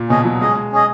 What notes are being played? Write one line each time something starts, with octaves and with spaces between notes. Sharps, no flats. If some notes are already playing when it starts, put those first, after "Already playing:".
Already playing: A#2
B2 C#4 G#4 D#5
F#3
G#3 C#4 G#4 D#5
C#4 G#4 D#5